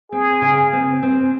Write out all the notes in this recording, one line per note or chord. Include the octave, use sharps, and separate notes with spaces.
C4 G#4
C#3
C4
C4